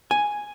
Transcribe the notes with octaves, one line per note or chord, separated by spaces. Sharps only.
G#5